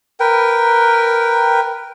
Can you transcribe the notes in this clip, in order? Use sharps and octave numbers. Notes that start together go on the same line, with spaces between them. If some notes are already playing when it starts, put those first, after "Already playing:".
A#4 B4 G5